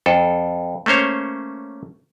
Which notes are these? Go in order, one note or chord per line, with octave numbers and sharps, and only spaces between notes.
F2 A4
A3 A#3 C#4 C5 C#5